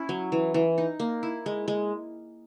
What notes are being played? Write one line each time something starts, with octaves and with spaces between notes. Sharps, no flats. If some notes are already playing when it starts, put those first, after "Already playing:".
Already playing: C#4 E4
F#3
E3
E3
D#4
A#3
E4
G#3
G#3